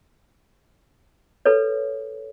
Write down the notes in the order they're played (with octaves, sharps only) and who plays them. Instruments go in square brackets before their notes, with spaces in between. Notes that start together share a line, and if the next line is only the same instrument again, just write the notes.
[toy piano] A4 B4 C#5